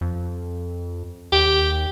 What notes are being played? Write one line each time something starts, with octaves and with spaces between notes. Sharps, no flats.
F2
D#2 G4